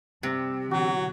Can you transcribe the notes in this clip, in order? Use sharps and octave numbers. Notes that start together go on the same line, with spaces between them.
C3 G3 C4
B2 D3 E3 F#3 F#4